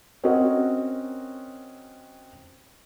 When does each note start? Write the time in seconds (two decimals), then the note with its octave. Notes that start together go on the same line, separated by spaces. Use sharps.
0.24 C4 C#4 F#4 A#4 D#5 F#5